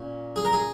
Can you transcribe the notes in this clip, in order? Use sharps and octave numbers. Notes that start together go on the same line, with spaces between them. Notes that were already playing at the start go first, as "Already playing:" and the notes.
Already playing: A#2 C#4
G#4
A#4
G#4